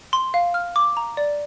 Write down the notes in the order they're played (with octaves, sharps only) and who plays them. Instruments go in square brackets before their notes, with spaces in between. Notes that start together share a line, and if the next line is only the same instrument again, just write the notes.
[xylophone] C6
F5
F6
D6
A#5
D5